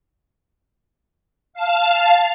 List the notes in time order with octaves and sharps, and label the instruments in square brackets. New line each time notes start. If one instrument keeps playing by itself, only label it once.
[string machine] F5 A5